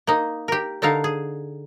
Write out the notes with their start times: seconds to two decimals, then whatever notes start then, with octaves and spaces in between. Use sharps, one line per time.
0.07 A#3 D#4
0.48 G4 A#4
0.82 D3 D#4 A4 A#4 F5
1.04 G#4